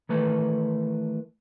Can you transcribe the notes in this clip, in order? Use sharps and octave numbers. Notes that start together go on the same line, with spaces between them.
D#3 E3 A3 B4